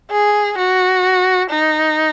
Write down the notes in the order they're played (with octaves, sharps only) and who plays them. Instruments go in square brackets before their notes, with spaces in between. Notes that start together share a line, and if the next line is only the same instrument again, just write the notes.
[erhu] G#4
F#4
D#4